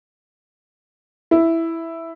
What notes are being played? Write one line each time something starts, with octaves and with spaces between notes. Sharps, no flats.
E4